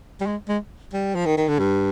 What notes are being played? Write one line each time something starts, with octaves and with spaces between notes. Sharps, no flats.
G3
G#3
G#3
G3
F3
D#3
D#3
D3
G2